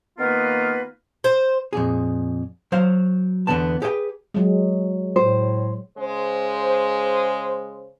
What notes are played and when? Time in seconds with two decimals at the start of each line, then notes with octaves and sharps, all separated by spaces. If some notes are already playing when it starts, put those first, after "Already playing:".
0.18 D#3 A#3 B3 F4 A#4 B4
1.24 C5
1.73 F2 A#2 G#4
2.72 F#3 C5 F5
3.47 E2 B2 D3 B3 A5
3.82 G4 G#4 B4 E5 G5
4.34 F#3 G#3
5.16 A2 C5
5.98 C#3 G#3 C5